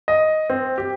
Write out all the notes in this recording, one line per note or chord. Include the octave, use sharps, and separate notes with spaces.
D#5
C4
G4